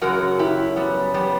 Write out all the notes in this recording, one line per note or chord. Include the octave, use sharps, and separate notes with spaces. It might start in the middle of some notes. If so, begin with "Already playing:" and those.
F#2 C#3 F#3 F#4 A#4
E4 G4
G3 B3
G3 B3